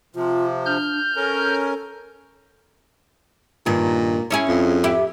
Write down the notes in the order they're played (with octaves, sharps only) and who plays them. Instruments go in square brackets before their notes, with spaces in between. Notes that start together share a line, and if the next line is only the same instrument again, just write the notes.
[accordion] C3 F3 [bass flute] F4
[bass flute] D4 [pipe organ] F6 G6
[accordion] C#4 A#4 [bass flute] A4
[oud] G2 D#3 [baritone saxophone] A#2
[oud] C#4 E4 G#4
[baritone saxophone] F2
[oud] E4 G4